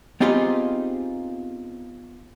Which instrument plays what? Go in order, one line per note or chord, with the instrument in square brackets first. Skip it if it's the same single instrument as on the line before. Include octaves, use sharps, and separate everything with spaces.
[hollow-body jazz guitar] B3 C4 D#4 F4 G4 G#4